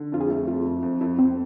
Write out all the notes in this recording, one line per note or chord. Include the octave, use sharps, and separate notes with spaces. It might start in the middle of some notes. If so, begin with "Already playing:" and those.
Already playing: D3
F2 F4
G#4
A3
F2 F4
F2
F2
F2 E4
F2 C4